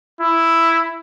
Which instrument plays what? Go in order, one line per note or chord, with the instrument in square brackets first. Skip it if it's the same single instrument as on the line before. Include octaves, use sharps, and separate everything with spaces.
[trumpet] E4